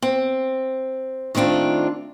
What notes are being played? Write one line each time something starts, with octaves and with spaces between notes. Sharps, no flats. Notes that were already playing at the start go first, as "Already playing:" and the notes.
C4
D#3 A3 C4 D4 F4